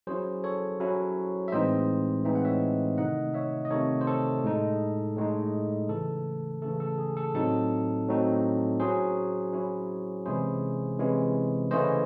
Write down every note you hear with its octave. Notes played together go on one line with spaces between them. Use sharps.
F#3 C#4 E4 G#4 C5
A4 C#5
F#3 C#4 E4
E5
A2 E3 G#3 C4 D#4 C5 D#5
A2 E3 G#3 C4 D#4 E5
F#5
C#5 E5
C3 D#3 A3 D#4 D#5 F#5
C#5 E5
D#5
C3 D#3 A3 D#4 A4 C#5
C5
A4
A2 G#3 D#4
A2 G#3 D#4
C#3 E3 A3 A4
C#3 E3 A3 A4
A4
G#4
A4
A2 F#3 C4 D#4 A4
A2 F#3 C4 D#4
F#3 C#4 E4 G#4 C5
F#3 C#4 E4
C3 E3 G#3 C#4 E4 G#4 C5
C3 E3 G#3 C#4 E4
C#3 E3 A3 C#4 E4 C5 D#5